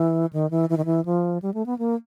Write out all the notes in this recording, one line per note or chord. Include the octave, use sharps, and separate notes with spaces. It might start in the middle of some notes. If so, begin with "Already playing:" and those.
Already playing: E3
D#3
E3
E3
D#3
E3
F3
G3
A3
B3
A#3